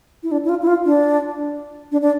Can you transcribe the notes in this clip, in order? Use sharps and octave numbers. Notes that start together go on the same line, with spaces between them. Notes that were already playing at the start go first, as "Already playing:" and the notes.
E4
D4
E4
F4
E4
F4
D4
D4
D4